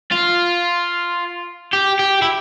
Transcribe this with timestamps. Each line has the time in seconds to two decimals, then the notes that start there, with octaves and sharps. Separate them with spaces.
0.12 F4
1.73 G4
1.99 G4
2.22 E4